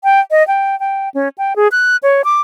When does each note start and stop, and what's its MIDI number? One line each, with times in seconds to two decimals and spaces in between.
0.04 0.20 79
0.31 0.46 75
0.48 0.78 79
0.80 1.09 79
1.14 1.29 61
1.38 1.56 79
1.56 1.68 68
1.72 1.97 90
2.03 2.22 73
2.24 2.41 86